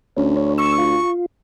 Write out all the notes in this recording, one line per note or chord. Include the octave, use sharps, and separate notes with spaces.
D2 C#4
C#5
C#6 E6
F4